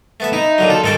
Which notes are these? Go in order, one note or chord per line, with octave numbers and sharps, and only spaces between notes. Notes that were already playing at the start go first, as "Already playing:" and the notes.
A3 B3 E5
D#4 E4
A#2 D3 F#3
F4 A4
G#2 D#3 G3 A4 G5